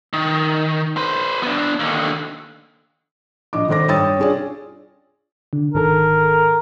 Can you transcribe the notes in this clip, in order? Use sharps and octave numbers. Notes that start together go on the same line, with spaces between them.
D#3
B4 C5
B3 D4
D#2 D3
A#1 D#5 D6
G#1 A4 C5 D6 A#6
G2 C#5 G5 D#6 E6 A6
C#4 D4 F4 G#4 C#5 D5
D3
G#1 D#3 A4 A#4